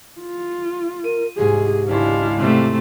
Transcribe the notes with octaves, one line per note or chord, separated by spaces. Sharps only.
F4
A#4 D#7
C2 G#2 G4 G#4
G#1 C#2 D4 E4 F5 C6
C3 A3 C6